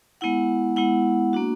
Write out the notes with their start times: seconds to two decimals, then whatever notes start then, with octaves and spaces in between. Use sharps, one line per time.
0.21 G#3 B3 E4 F#5
0.76 G#3 B3 E4 F#5
1.33 A#3 D4 F#4